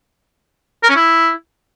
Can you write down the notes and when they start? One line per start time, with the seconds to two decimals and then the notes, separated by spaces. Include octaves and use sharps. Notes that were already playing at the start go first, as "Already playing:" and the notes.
0.83 A#4
0.90 C#4
0.96 E4